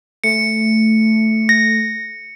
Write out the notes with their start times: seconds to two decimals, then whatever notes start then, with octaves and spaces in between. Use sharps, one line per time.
0.24 A3 C#7
1.49 A#6